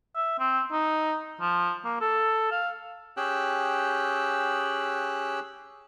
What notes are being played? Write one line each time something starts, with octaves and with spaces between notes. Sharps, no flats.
E5
C4
D#4
F3
A#3
A4
F5
C#4 G4 G#4 G5 E6 F#6